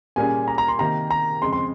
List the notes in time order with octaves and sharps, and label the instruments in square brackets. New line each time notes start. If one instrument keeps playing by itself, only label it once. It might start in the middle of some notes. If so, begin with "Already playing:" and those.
[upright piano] A#2 G3 A#3 C#4 G#4 [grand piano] G#5
[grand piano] A#5
A#5
C6
[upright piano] C3 D#3 A#3 [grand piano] A#5
[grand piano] A#5
[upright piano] F2 C#3 G#3 C4 [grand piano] C6
[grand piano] C6